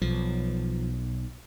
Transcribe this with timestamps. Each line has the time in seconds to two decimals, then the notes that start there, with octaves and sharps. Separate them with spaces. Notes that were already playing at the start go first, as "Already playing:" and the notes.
0.02 B1 F3